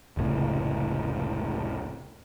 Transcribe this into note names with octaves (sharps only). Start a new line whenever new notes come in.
F1 C#2 A2 C#3